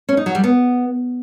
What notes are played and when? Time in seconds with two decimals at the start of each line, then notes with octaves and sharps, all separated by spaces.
0.09 C#4
0.17 D#4
0.26 F#3
0.35 G3
0.44 B3